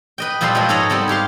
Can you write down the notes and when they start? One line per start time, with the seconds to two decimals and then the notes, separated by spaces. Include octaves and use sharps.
0.18 B4 D#5 G5
0.41 A#2 F3 G3 A4 D5 C6
0.55 F3 G#3 F4 F#4 A4 B4
0.69 G#2 A4 C#5 D#5 F#5 A#5
0.90 G3 B3 C4 A4
1.08 G#2 G4 F5 C6